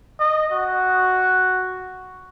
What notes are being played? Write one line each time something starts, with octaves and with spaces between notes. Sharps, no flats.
D#5
F#4